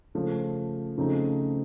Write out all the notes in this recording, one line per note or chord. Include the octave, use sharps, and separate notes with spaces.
C#3 F3 A3 C#4
C#3 F3 A3 C4 D#4